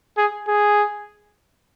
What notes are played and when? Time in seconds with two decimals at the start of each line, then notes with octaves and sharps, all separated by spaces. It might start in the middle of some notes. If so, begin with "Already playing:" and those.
0.17 G#4
0.48 G#4